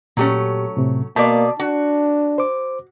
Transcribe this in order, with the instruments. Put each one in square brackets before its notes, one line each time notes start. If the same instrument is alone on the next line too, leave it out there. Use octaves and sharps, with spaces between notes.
[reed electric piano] A#2 G4 [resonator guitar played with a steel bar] F#3 A3 C#4
[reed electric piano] A2 C3
[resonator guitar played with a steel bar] B2 D5 [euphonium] A#3 [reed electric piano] A5
[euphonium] D4 [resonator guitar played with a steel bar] F#4
[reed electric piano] C5 D6